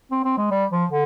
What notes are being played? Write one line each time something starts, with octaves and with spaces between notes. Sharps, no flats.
C4
C4
G#3
G3
F3
D3